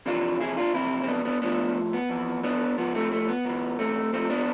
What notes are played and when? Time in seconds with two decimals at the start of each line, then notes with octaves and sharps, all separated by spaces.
0.06 F2 C3 E3 D4 F4
0.40 E4 G#4
0.57 D4 F4
0.74 F2 C3 E3 C4 E4
1.04 C4
1.08 B3 D4
1.25 B3 D4
1.42 A2 F3 B3 D4
1.93 B3
2.09 F2 E3
2.43 B3 D4
2.77 G#2 F3 B3
2.95 A3 C4
3.12 A3
3.28 B3
3.45 G#2 E3
3.79 A3 C4
4.13 G#2 F3 A3 C4
4.30 B3 D4